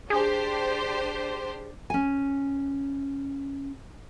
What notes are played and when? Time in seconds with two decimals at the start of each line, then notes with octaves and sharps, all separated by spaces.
0.10 D4 G4 G#4 C5
1.90 C#4 G#5